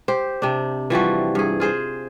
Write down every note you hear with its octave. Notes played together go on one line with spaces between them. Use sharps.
G4 C5
C3 D4
E3 F3 G3 F#4
G2 G#4
F4 G#4 C5